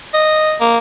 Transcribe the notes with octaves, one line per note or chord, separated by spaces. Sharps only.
D#5
A#3